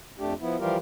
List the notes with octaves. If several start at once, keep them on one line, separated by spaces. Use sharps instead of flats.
F2 A3 D4 G4
F3 B3 E4
E3 F3 G3 F4 G4 A#4